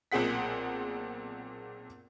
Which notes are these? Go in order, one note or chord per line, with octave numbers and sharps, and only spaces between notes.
B1 A#2 C4 G#4 F#5 B6